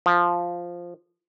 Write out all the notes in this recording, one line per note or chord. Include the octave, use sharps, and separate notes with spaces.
F3